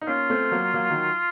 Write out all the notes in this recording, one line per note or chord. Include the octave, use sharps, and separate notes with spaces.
D#4
A#3 C#4 F4
A3 C4
F#3 A#3
F#3 A#3
D#3 F#3